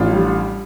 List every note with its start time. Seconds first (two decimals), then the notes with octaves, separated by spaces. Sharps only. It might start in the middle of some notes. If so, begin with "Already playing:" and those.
Already playing: A1 D4 F4
0.13 G3